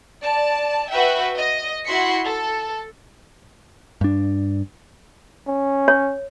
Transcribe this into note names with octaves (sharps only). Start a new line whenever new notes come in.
D5 A5
F#4 B4 E5 G5
D#5
E4 F#4 C6 B6 C#7
A4
G2 D4
C#4
C#5